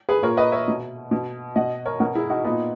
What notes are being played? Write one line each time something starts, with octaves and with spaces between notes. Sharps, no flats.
G#4 B4
A#2 A#4 C#5
B4 D#5
C#5 E5
B2
B2
B2 D#5 F#5
A#4 C#5
B2 F#4 A#4
E4 G#4
D#4 F#4
A#2 B3 D#4